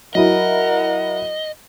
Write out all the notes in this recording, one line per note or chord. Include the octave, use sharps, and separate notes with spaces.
F#3 E4 A#4 D#5 F#5